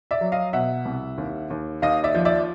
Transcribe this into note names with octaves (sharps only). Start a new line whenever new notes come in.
D5 E5
F#3
D#5 F5
B2 E5 F#5
C2
D#2
D#2
D#2 D#5 F5
D5 E5
F3
D5 E5